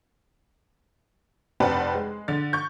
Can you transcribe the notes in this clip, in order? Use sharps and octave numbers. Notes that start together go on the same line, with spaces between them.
F1 C4 B4 D5 F#5 A5
G#3
D3 A6
C#6 G6